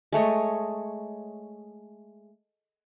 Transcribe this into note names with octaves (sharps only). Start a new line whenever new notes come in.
G#3 A3 C#5 D#5